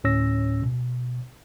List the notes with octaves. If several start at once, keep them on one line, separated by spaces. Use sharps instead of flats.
D2 A2 C#4 C#5 E6 A#6
B2